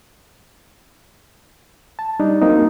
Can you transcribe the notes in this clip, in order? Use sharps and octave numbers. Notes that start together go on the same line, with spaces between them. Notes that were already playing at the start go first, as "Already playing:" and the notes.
A5
G3 D4 D#4
F#3 A#3 C4 D#4